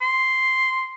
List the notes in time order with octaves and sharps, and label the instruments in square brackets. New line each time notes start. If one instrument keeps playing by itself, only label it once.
[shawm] C6